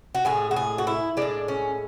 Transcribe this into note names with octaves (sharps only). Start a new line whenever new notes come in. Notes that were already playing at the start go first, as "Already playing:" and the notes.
F#4
A2 G#3 G#4
F#4
G#4
F#4
E4
A2 G#3 D4
C#4